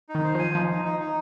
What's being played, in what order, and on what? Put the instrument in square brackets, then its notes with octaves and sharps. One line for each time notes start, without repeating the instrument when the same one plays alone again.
[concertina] D#4
[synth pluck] D#3
[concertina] C5
[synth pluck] F3 [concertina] G#5
[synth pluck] F3 [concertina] D#4
[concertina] D#4
D#4
D#4